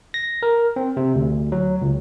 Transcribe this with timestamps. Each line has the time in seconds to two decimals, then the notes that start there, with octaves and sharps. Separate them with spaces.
0.14 A#6
0.43 A#4
0.76 C4
0.97 C3
1.15 D2
1.52 F#3
1.82 C#2